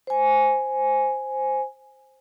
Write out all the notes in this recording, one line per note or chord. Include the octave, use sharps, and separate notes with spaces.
C5 G#5